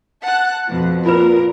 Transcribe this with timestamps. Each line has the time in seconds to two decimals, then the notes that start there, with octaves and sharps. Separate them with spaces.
0.23 F#5 A5 F#6
0.68 F2 B2
1.06 A#2 F4 A#4 B4